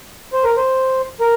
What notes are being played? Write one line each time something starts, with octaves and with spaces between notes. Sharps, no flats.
C5
A#4
C5
A#4